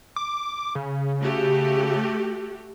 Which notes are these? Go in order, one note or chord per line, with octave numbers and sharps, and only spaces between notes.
D6
C#3
A3 F#4 G4